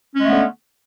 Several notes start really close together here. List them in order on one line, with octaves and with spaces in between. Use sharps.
C#4 G#3 A3 B3 D3